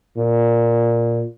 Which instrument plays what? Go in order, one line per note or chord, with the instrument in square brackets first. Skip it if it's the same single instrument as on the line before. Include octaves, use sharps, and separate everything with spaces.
[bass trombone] A#2